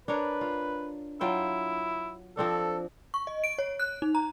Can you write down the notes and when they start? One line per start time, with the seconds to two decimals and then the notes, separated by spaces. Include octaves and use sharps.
0.08 D4 A#4 B4 C#5
0.41 F4
1.21 F#3 E4 F4 G5
2.37 F3 C4 D4 A4
3.14 C#6
3.27 D#5
3.44 D7
3.59 C#5
3.80 F#6
4.02 D#4
4.15 A#5